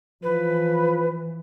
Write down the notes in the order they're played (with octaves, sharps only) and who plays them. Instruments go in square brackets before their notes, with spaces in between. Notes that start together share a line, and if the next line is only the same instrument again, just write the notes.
[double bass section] E3 [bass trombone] F3 [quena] B4